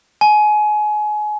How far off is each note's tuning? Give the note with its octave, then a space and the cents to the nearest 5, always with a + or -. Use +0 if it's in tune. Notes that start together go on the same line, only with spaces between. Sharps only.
G#5 +25